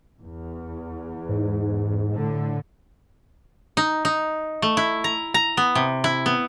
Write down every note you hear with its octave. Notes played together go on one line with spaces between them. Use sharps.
E2
G#2
A2 D3
D#4
D#4
A3
E4
A#5
A#5
B3
C3
E4
B3